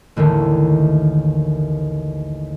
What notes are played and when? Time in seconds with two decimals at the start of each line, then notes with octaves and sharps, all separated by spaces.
0.16 A1 D#2 D3 D#3